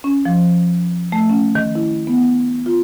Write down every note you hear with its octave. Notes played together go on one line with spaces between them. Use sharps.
C#4
F3
A3
C#4
D#3
E4
B3
F4